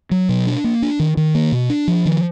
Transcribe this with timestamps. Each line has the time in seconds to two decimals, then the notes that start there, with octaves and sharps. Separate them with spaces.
0.11 F#3
0.29 B2
0.47 D4
0.64 A#3
0.82 D4
0.99 D#3
1.17 D#3
1.35 A#3
1.52 B2
1.70 D4
1.88 F3
2.06 D#3